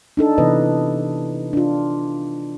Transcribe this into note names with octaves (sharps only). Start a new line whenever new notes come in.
D4 D#4 A4
C3 E3 B3 B4 D#5
D4 F4